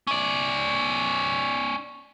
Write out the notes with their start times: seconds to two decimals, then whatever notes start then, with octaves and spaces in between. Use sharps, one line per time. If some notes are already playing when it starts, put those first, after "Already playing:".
0.07 C#4 D5